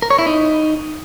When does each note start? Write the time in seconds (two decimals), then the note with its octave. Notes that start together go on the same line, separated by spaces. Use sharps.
0.02 A#4
0.10 C#5
0.19 E4
0.27 D#4